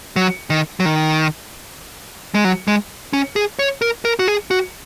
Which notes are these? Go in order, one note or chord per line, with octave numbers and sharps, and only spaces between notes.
F#3
D#3
F#3
D#3
G#3
F#3
G#3
C#4
G#4
C#5
A#4
A#4
F#4
G#4
F#4